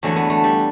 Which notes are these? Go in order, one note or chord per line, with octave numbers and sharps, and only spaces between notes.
E2 D3 F#3 A3
B3
A3
G3